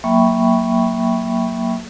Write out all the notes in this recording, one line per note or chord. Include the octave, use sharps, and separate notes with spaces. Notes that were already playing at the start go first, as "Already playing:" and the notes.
F#3 A#3 E5 G5 B5 C#6